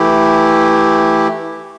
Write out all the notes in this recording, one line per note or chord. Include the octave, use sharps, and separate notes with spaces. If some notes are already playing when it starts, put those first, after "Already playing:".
Already playing: E3 A3 E4 G4